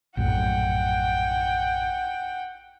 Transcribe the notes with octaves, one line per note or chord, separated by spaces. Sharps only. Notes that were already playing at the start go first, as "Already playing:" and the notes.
A#1 F#2 A2 F#5 G5